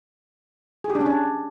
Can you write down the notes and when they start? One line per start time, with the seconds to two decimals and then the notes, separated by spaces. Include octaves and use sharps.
0.84 G#4
0.90 G4
0.95 D4
1.01 C#4
1.06 D4